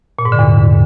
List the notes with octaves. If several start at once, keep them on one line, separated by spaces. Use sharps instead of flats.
A#2
G#2
D3
E2